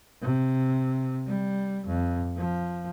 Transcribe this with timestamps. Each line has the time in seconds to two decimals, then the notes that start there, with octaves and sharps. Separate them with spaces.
0.21 C3
1.26 G3
1.86 F2
2.37 F3